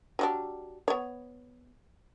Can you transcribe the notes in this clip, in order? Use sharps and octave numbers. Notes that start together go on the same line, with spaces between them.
F#3 G3 D4
B3 C#5